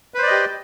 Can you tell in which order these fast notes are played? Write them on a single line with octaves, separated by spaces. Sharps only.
B4 C5 D5 D#5 G4